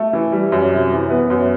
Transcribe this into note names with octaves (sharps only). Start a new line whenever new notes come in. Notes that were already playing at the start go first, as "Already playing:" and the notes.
Already playing: A3
E3
G3
F#2
C3
E3
B3
F#2